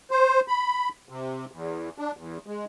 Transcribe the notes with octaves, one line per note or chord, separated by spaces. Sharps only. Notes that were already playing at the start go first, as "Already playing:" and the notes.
C5
B5
C3
E2
D4
E2
G#3